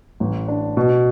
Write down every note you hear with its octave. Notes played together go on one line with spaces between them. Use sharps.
A1
D4
B2